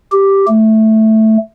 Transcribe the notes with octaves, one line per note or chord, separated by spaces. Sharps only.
G4
A3